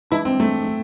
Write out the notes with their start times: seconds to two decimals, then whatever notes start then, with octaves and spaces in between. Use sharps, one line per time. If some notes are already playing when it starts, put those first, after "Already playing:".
0.11 E3 G#3 D4 E4
0.25 C4
0.40 A3
0.68 A3